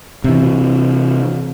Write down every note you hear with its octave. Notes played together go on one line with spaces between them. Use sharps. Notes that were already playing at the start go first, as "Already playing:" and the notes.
C3 E3